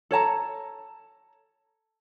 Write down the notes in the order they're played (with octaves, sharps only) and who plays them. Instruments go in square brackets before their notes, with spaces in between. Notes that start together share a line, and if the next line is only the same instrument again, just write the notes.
[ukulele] A4 C#5 A5 A#5